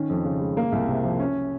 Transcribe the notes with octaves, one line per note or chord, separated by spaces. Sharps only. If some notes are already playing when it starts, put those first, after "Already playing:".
Already playing: D#3 C#4
F2
C#3
G#3
A#3
C2
C3
F3
C#4